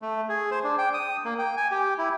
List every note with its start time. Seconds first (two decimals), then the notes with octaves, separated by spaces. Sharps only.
0.02 A3
0.29 G#4
0.51 C5
0.64 D4
0.78 G5
0.94 D#6
1.25 A#3
1.39 G5
1.57 G#5
1.71 G4
1.98 E4